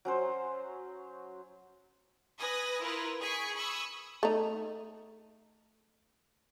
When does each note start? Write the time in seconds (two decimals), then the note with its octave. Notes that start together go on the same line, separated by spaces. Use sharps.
0.05 F#3 C#4 C5
2.38 B4 G#5 D#6 A#6
2.83 E4 F4 A#4 B4
3.21 G#4 G#5 C#6 B6 D7
3.55 B5 C#6 D#6 E6
4.23 A3 D#4